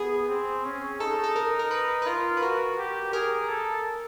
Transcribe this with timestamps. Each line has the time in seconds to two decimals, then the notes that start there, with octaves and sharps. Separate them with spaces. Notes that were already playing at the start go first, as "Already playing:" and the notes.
Already playing: B3 G#4
0.29 C4
0.65 C#4
1.00 D#4 A4
1.24 A4
1.36 A#4
1.59 A#4
1.71 B4
2.02 B4
2.06 F4 A#4
2.37 B4
2.42 F#4 A#4
2.78 G4
3.13 G#4 A#4
3.49 A4